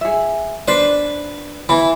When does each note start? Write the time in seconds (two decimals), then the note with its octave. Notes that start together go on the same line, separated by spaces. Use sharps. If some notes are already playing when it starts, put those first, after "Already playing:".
0.01 G#4 E5
0.68 D4 B4 C5 D5
1.69 E3 B5